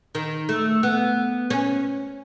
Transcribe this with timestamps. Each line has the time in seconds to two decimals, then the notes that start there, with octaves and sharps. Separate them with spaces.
0.15 D#3
0.49 A3
0.83 B3
1.50 C#4